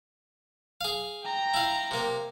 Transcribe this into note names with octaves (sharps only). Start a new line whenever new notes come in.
G#4 F5
G5 A#5
E4 F5
C3 A#3